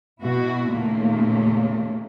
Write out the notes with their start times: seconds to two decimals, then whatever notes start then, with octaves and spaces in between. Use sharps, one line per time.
0.20 B2 E4 F#4
0.71 D#2 A#2 C#3 A3 A#3